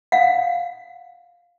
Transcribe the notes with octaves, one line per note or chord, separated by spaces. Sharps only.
F5 F#5